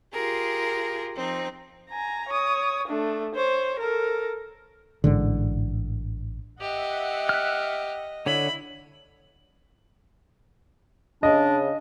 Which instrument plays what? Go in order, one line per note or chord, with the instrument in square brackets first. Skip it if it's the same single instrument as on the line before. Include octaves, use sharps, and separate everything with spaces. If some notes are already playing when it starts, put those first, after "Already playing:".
[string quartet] F4 G4 G#4 A#4
F3 C4 D#4
[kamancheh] G#5 A#5
C#5 D#6
A3 D4
C5 C#5
A4 A#4
[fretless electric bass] A1 G#2 D3
[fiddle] G4 [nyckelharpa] D#5 [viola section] E5 F#5
[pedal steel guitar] F6 F#6
[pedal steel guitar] D3 C#5 [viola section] E4 [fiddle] B5
[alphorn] C#3 [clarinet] D4 [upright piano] D#5